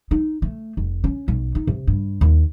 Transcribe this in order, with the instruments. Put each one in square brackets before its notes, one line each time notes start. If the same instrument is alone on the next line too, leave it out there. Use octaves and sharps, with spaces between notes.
[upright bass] D#4
A3
F1
C#4
B1
D#4
C3
G2
D#2